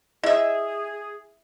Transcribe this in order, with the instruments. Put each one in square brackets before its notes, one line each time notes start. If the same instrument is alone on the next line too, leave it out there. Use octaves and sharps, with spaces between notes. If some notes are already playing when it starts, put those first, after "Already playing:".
[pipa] E4 E5 [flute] G#4 [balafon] D#5